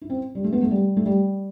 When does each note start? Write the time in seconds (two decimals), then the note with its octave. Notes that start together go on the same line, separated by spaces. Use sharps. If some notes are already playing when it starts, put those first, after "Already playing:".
0.01 E4
0.10 C4
0.35 G3
0.44 A3
0.53 B3
0.62 A3
0.71 G3
0.97 A3
1.06 G3